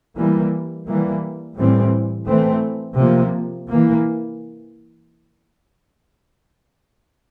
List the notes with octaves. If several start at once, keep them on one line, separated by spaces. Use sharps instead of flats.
E3 G3 A#3
E3 G3 A#3
A2 E3 G3 C4
E3 A3 C4
C3 F3 A#3
E3 A#3